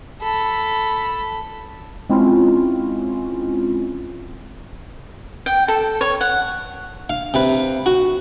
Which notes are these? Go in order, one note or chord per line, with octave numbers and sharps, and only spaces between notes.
A4 B5
G#3 C4 C#4 E4 F4
G5
A4
C#5
F#5
F5
C3 B4
F#4